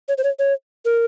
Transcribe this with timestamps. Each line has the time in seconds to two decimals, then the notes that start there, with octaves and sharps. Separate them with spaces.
0.08 C#5
0.18 C5
0.24 C#5
0.39 C#5
0.85 A#4